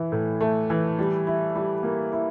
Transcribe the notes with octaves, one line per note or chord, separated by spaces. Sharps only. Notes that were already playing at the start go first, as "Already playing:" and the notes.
Already playing: E3 E4
A2
A3
E3
G3
E4
G3
A#3
E4